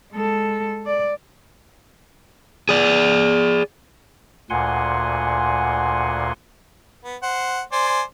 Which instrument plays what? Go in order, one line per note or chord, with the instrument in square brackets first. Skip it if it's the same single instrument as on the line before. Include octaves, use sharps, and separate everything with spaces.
[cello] G#3 A4
D5
[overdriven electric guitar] G#4 D5
[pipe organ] D2 A#2 F#5 G#5 C6
[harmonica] B3
C5 F#5
C5 D5 G#5